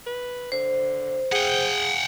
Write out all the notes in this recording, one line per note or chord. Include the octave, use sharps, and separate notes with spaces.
B4
D3 C5
G#4 F#5 G5